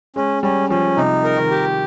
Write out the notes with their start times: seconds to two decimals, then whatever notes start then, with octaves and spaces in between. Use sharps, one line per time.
0.16 G#3 C#4
0.43 G3 C#4
0.70 F3 C#4
0.97 C3 D#4
1.24 A#4
1.37 D#3
1.51 G4